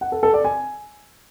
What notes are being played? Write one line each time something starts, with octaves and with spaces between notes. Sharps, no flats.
F#5
A4
A4
D5
G#5